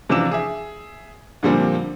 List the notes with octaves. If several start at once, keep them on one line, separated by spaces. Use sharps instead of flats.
C3 E3 F3 D4 E6 E7
G#4 E5
A#2 D3 F3 G3 A#3 C4